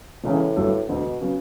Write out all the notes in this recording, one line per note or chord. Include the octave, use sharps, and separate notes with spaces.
E1 E2 A2 C#3 E3
G1 G2 F#3 A3
E1 D2 B2 D3
C#3 F#3 B3